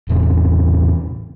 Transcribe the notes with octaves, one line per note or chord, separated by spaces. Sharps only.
E2 A2 C3